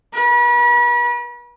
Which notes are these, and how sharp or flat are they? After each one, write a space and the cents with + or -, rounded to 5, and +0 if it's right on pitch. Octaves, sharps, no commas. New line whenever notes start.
B4 -40